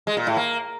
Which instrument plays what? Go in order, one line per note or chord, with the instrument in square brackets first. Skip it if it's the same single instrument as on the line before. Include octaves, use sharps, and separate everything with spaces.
[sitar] G#3
A#2
A2
A#3